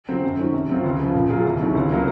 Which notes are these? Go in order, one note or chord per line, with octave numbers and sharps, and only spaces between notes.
C#3 F#3 C4
F#2
D#3 F#3 C#4
C3
F#3 C4 F4
C#2
C#3 F3
A#2
F#3 A#3 F4 G#4
C2
C3 D#3 F#3 C#4
C#2
C3 F#3 A#3